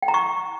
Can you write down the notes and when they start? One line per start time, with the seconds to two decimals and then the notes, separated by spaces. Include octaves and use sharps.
0.02 G5
0.08 A#5
0.14 C#6